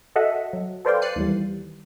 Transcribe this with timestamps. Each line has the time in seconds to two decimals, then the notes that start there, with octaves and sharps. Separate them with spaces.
0.16 F#4 A4 D#5 E5 F#5
0.53 F#3
0.85 A4 B4 C5 D5 F5 G5
1.02 F#6 A6 C7 C#7 D#7
1.16 D#2 D#3 E3 G3